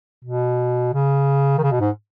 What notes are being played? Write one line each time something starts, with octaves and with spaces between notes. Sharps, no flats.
B2
C#3
D#3
C#3
B2
G#2